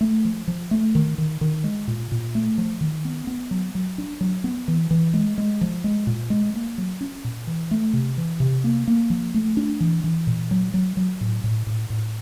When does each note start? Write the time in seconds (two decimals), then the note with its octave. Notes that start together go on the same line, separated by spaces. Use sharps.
0.01 A3
0.25 F3
0.48 F3
0.71 A3
0.95 D#3
1.18 D#3
1.41 D#3
1.64 G#3
1.88 A#2
2.12 A#2
2.35 A3
2.58 F3
2.81 D#3
3.05 B3
3.27 B3
3.51 F#3
3.75 F#3
3.98 D4
4.21 F#3
4.44 B3
4.68 E3
4.91 E3
5.14 G#3
5.38 G#3
5.61 F3
5.84 G#3
6.07 A#2
6.30 G#3
6.54 A#3
6.78 F#3
7.01 C#4
7.24 A#2
7.47 E3
7.71 A3
7.93 C3
8.17 E3
8.40 C3
8.64 A#3
8.87 A#3
9.10 F3
9.34 A3
9.57 D4
9.80 E3
10.04 E3
10.27 A#2
10.51 F#3
10.74 F#3
10.97 F#3
11.21 A2
11.44 A2
11.67 A2
11.90 A2